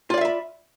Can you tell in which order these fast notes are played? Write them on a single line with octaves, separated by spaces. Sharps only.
F4 D5 F5 E5 B5